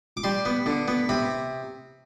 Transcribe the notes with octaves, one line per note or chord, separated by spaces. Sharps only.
D6
G3 C6
B3
D3
B3
C3 B5